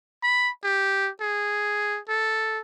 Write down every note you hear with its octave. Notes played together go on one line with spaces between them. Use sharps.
B5
G4
G#4
A4